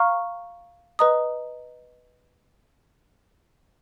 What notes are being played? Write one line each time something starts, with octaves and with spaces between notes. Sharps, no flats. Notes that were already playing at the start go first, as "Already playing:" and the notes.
Already playing: F5 A#5 C#6 F6
B4 D#5 A#5 D#6